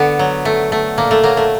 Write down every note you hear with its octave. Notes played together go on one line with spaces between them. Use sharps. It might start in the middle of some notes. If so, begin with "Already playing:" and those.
Already playing: D3 B3
F#3
A3
A3
A#2 A#3
A3
F#3 A#3
A3